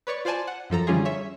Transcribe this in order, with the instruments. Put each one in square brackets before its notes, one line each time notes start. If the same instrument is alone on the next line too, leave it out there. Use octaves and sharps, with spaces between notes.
[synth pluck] B4 C#5 D5 C#6
F4 C5 D5 G#5 A5
F#5
F#2 F3 A4 A#5
D3 E3 G3 C#4 F4 G#4
C#5 E5